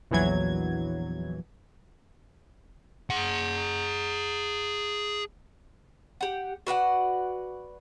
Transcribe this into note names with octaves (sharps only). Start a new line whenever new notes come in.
A#1 E2 E3 F#3 G#6
G#4 F#5
G4 F#5
F#4 B4 D5 F#5